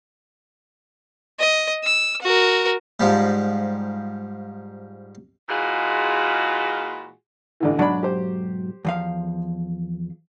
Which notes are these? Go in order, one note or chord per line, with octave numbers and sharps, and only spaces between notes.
D#5
E6
F#4 A#4
G#2 F3 G3
A#2 E3 G#3 F4 F#4 G#4
A1 D3 E3
B1 G#2 F#3 D4 D5 B5
G4 C5
E2 F3 F5